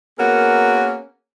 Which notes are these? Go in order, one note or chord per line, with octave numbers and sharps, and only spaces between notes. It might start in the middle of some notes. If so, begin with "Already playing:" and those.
A#3 B3 C#4 F#4 G#4 A#4